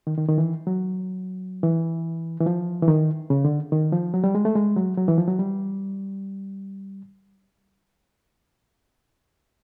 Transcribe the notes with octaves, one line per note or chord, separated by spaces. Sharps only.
D#3
D#3
D#3
E3
F#3
E3
E3
F3
E3
D#3
C#3
D3
D#3
F3
F#3
G3
G#3
A3
G#3
F#3
F#3
E3
F3
F#3
G3